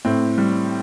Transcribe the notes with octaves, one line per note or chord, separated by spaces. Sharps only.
A2 C4
G3